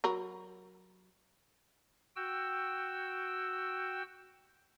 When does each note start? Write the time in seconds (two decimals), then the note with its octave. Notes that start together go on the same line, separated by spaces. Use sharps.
0.04 F#3 A#4 B5
2.16 F#4 G5 E6